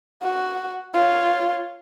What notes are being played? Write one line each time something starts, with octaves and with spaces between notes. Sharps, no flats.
F#4
F4 C#5